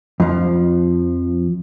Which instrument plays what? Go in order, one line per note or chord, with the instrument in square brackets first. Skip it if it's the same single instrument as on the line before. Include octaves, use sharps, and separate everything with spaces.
[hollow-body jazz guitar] F2 F3